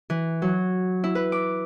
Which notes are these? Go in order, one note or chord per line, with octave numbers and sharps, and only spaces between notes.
E3
F#3
E4
B4
D6